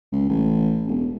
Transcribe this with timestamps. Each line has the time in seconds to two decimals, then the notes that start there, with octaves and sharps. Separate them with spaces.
0.12 C#2
0.29 A1
0.87 E1